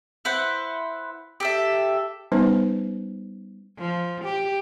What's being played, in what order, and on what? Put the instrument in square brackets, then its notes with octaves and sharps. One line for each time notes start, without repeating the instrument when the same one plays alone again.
[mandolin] E4 B4 C5 F#5
G4 A4 E5
[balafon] G3 B3 C#4 D#4 B4 C5
[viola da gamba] F3
G4